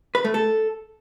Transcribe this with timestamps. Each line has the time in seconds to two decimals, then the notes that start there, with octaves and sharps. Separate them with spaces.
0.15 B4
0.24 A3
0.34 A4